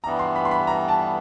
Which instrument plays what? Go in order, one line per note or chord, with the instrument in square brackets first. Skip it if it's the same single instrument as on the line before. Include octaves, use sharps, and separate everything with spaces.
[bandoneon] G2 E3 G3 B3 [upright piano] A#5
[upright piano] C6
B5
C6
B5
A#5
A5